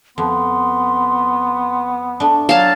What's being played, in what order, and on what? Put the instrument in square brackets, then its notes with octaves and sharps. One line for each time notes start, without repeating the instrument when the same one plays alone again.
[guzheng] F2 [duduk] B3 [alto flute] C6
[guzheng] A3 D4
[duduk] F#3 [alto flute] C#5 [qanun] F5 A5